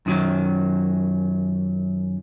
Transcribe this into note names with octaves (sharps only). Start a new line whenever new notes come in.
F#2 D#3 F#3